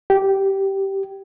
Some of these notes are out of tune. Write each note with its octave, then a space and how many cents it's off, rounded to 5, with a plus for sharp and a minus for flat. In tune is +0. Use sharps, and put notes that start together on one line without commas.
G4 -10